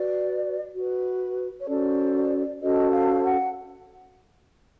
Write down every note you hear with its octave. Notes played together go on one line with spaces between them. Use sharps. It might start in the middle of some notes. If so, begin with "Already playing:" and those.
Already playing: F#4 B4 D5
F#4 B4
C#5
C#4 F#4 A4 C5 D5
C#4 F#4 A4 C5 D#5
F5
F#5